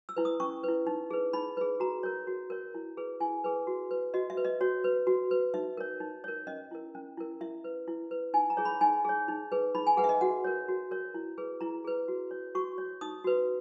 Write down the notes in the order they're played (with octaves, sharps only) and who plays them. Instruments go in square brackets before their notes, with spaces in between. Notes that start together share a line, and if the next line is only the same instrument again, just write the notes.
[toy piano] E6
E4 B4
D#6
C#4 C#6
E4 B4
D#4
G#4 B4
D#4 B5
G#4 B4
F#4 A#5
A#4 C#5
F#4
A#4 C#5
E4
G#4 B4
E4 G#5
G#4 B4
F#4
B4
F#4 D#5
E5
B4
D#5
F#4 C#5
B4
F#4
B4
D#4 E5
A#4 C#5
D#4
A#4 C#5
C#4 D#5
E4 A#4
C#4
E4 A#4
E4 E5
B4
E4
B4
D#4 G#5
A#5
G#4 C#5
B5
D#4 G#5
G#4 C#5
D#4
G#4 B4
D#4 B5
G#5
G#4 B4 F#5
E5
D#5
F#4 F#5
A#4 C#5
F#4
A#4 C#5
E4
G#4 B4
E4 A#5
G#4 B4
F#4
C#5
F#4 C#6
C#5
D#4 D#6
F#4 B4